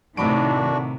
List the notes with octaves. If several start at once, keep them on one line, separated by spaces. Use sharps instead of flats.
A2 C3 D#3 D4 F#4 B5 D7